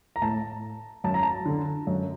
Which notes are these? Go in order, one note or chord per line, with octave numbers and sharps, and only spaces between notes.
A#5
A2 A5
F#2 A5
A#5
A5
D3
F#2